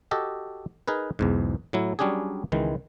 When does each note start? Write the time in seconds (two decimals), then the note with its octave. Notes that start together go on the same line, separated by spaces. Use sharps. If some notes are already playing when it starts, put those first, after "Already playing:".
0.11 F#4 G4 A4 D#5
0.88 D#4 G#4 A#4 B4
1.19 B1 E2 G#2
1.73 A2 F#3 E4
1.99 F#3 G3 C#4 D4 G4 G#4
2.52 C#2 D#3 E3 G#3